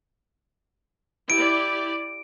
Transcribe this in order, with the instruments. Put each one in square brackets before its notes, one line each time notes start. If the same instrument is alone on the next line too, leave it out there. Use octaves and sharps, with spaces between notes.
[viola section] E4 G4 D5 [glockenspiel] D7